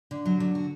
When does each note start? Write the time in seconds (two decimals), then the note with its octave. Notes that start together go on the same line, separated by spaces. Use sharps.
0.11 D3
0.25 F#3
0.40 D3
0.55 F#4